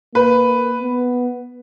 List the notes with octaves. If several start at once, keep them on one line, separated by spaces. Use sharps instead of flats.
A#3 B4
B3